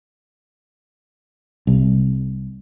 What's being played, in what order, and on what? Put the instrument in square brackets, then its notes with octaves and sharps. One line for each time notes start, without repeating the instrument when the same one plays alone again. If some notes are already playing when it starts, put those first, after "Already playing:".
[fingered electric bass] C2